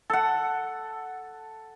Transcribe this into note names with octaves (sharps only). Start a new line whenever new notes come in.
A4 F#5